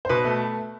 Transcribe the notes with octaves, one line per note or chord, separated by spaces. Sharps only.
C5
B2 B4
A3